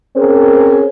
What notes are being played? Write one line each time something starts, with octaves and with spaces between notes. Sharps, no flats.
C4 C#4 G#4 A#4 C5